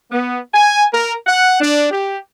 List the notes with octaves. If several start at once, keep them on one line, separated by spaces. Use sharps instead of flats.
B3
G#5
A#4
F#5
D4
G4